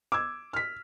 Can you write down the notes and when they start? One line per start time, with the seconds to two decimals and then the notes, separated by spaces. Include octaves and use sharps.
0.12 D6 E6 G#6
0.53 F6 B6